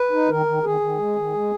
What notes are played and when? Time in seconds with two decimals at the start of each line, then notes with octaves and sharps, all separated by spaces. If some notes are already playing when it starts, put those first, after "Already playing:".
Already playing: B4
0.11 D#4
0.28 D#3 A#4
0.46 D#3
0.63 D#3 G#4
0.80 D#3
0.98 G#3
1.16 D#3
1.34 G#3